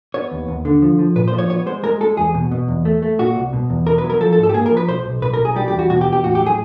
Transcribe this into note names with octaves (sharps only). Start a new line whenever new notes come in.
B3 C#5
D#2
D#2
D3
F3
F3
A#2 B4
C5
F3
C#5
B3 C#5
G#3 C5
G#3 A#4
G#3 A4
E2 G#4
B2
B2
E2
A3
A3
A#2 F#4
C2
B2
E2
B2 A#4
B4
F#3
A#4
F3 A4
A4
G#2
A4
G4
A#3 G#4
A#4
F3
B4
B1 C5
B1
B1 B4
A#4
B1
G#4
G3 G4
G4
E2
F#4
B2 F#4
G4
E2
G4
A2 F#4
G4
F#3
G#4